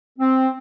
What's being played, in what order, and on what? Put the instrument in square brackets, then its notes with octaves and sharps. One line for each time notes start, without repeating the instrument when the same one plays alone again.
[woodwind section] C4